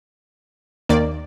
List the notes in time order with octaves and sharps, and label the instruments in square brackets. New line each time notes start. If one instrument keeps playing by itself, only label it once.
[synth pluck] D#2 D#3 A#3 D5